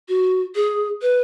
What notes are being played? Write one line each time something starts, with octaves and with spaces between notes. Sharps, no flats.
F#4
G#4
B4